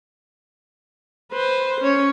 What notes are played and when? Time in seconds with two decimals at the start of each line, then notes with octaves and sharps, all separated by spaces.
1.32 B4 C5
1.81 C#4 C#5